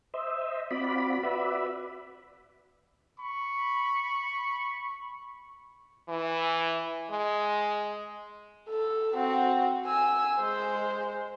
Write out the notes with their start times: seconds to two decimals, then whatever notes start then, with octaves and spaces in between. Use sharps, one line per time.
0.14 C5 D#5 E5
0.71 C4 F4 F#4 D5 B5
1.23 F#4 B4 D5 E5 B5
3.20 B5 C#6
6.09 E3
7.10 G#3
8.69 A4
9.15 C4 F#4
9.86 G#5 E6
10.39 G#3 C5